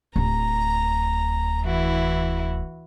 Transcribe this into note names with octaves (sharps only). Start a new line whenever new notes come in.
D1 A#5
E3 E4 F#4